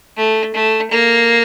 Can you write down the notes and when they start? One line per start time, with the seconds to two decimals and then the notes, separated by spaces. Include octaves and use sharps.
0.17 A3
0.54 A3
0.92 A#3